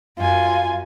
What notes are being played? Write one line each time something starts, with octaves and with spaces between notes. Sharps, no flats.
F#2 F4 G#5